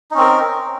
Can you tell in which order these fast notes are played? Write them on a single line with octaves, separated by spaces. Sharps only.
D#4 C#4 C4 A#4